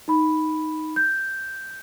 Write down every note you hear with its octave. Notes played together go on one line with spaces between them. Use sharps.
D#4 B5
G6